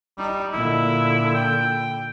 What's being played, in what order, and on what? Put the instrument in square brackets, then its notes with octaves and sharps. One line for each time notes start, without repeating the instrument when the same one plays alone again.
[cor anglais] G3 [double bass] D#4
[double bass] A#2 D3 [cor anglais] E4
[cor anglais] G5